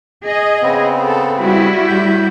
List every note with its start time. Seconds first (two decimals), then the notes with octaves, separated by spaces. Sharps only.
0.24 G#4 D#5
0.62 C#3 B3 C4
1.04 A4
1.42 G3 E4 F#4
1.88 A2 G6